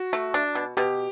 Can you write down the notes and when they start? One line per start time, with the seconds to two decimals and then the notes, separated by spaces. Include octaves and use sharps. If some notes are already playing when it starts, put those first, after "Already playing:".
Already playing: F#4
0.13 A3
0.34 D4
0.55 B2
0.77 B2 G4